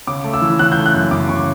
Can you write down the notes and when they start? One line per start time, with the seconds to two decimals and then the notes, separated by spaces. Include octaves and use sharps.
0.07 C#3 D6
0.24 A3
0.34 E6
0.42 E3
0.59 C#3 F#6
0.72 G6
0.77 A3
0.86 F#6
0.94 F#2
1.11 C#3 D6
1.29 C#3 C#6